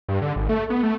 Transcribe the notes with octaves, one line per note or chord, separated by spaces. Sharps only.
G2
D3
G#1
A3
B3
A3